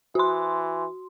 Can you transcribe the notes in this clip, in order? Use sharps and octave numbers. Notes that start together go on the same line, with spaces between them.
E3 F#4 C6